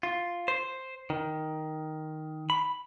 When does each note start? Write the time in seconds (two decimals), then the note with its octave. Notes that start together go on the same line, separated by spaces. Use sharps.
0.03 F4
0.48 C5
1.10 D#3
2.50 B5